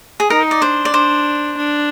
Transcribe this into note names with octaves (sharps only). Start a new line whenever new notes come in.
G#4
D#4 A#4
D5
D4 C5
D5
D4 C5
D4